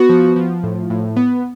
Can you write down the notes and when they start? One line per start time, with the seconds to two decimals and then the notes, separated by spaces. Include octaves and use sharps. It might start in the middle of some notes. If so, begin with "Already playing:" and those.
Already playing: B3 F#4
0.09 F3
0.36 F3
0.64 A2
0.90 A2
1.16 B3